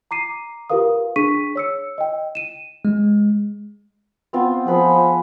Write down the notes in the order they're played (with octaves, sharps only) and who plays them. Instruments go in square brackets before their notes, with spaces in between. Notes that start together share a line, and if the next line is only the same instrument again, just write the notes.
[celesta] A#5 D6 C7 D#7
F4 G4 A#4 B4 F5 D#6
D4 G#4 C#6 B6 D#7
C#5 E6 C#7
D#5 G5
D#7 E7
[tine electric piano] G#3
[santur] B3 C4 F4
[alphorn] F3 [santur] G#4 B4 B5